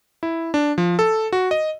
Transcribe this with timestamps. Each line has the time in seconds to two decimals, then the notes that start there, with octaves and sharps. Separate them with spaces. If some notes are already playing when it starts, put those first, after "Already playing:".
0.23 E4
0.54 D4
0.78 F3
0.99 A4
1.33 F#4
1.51 D#5